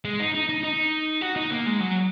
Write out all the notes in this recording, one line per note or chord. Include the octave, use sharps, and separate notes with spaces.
G#3
D#4
D#4
D#4
D#4
F#4
D#4
A#3
G#3
F#3